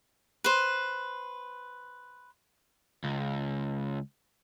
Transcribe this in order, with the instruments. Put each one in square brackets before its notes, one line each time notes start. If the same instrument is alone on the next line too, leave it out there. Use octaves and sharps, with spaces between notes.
[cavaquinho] B4 C5
[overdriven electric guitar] C#2